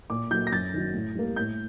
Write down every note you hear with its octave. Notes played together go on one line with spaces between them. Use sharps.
A#2 D6
F#3 A#3 G6
A#6
F#2 A6
D#3 F#3
A2
G3 A#3
A2 G6